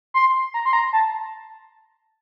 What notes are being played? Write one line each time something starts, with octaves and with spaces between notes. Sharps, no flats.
C6
A#5
C6
A#5
A5